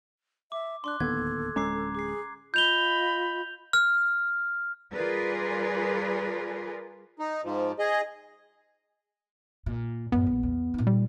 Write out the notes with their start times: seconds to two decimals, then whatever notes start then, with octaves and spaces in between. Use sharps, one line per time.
0.52 E5 D6
0.84 D4 C6 D6 F#6
1.00 D1 D#2 B3 A4 G#6
1.56 D1 G#3 C#4 A#5 D6 C7
1.95 G#4 D6 C7
2.54 F4 D#5 B5 G6 F7 G7
3.73 F6
4.93 G3 F4 G#4 A#4 B4 D5
7.19 D#4
7.44 G#2 F3
7.79 G#4 D#5
9.66 A#2
10.12 F#2 A2 B3
10.26 A#1
10.43 E2
10.74 A#2 D#4
10.87 G3